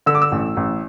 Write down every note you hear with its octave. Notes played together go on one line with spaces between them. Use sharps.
D3 E6
D6
E6
A1
A1